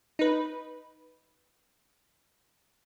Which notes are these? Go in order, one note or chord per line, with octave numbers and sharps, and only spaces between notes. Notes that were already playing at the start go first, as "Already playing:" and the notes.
D#4 B4